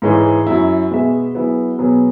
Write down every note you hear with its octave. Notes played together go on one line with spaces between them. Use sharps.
G#2 E3 G#3 E4 C#5
F#2 F#3 E4
B2 G#3 B3 G#4 E5
F#3 B3 E4 G#4
B2 F#3 B3 G#4 C#5